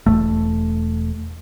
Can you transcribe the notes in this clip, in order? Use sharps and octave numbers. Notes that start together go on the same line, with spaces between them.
E1 F2 A3